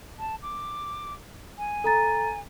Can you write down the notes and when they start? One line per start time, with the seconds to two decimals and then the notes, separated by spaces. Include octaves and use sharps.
0.18 A5
0.42 D6
1.58 G#5
1.84 A4 A#5 A6